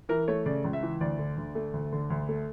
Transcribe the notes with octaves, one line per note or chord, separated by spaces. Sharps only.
E3 A#4
A3 C#5
C#3 D5
C#2
E5
E3
D2 D5
D3
D2
A3
D2
D3
D2
A3